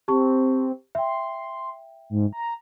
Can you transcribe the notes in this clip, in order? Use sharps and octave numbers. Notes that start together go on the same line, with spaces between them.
C4 G4 A5 C#6
E5 G5 C6
G#2
A#5